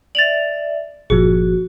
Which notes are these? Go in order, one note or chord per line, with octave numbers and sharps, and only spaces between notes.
D5 E5 A6 F7 F#7
G1 A#2 F3 F#4 G#4